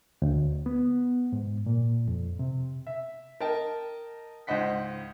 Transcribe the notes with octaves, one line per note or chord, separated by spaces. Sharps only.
D2
B3
G#2
A#2
F2
C3
E5
A#4 D#5 G5 A5
C#2 G#2 C5 D#5 F#5 B6